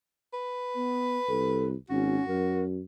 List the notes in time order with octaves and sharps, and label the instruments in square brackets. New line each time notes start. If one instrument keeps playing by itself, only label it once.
[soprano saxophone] B4
[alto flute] B3
[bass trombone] C2 [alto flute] A4
[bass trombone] G#1 [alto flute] C#4 [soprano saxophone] F#4
[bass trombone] F#2 [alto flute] A#4